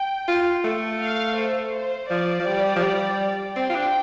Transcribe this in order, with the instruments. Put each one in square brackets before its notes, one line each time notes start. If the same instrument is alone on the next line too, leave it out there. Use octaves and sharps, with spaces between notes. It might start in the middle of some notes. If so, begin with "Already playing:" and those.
Already playing: [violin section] G5
[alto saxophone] F4
A3
[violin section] F5
C5
C5
[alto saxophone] F3 [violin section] D5
[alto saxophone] F3
G3
F3
G3
[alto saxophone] C4 [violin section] G5
[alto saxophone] F4
D4